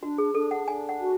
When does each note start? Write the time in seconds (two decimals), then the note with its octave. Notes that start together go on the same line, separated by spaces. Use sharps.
0.02 D4 F#4
0.18 G#4
0.35 D4 A4
0.51 F#5
0.67 D4 G#5
0.89 F#5
1.00 F#4